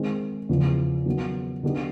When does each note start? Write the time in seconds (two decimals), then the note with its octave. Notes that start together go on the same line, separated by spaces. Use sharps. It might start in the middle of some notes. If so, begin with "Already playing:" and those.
Already playing: D#3 G#3 C4
0.49 E2 C#3 F3
1.06 D#3 F#3 B3
1.63 D3 F#3 B3 D#4 G4